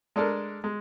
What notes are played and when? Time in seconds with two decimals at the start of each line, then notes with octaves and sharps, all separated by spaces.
0.16 G#3 D4 A4 A#4
0.64 G#3